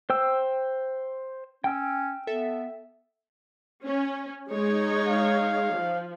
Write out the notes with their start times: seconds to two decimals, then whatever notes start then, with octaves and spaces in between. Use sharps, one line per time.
0.10 C5 G5 E6
1.64 C#4 G5 E6
2.27 B3 A4 E5
3.84 C#4
4.50 G#3 D#4 C#5
5.08 F5
5.72 F3